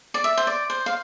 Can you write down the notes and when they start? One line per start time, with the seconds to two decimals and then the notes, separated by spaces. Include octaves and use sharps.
0.14 D5
0.24 E5
0.37 C5
0.47 D5
0.70 C5
0.86 F5